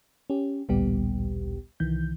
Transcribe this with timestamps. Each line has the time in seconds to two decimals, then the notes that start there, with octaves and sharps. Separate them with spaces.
0.30 C#4 G4
0.69 A1 D2 A#2 G3 B3 G4
1.80 C2 D#3 E3 G6